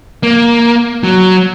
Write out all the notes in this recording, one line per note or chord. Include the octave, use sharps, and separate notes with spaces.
A#3
F#3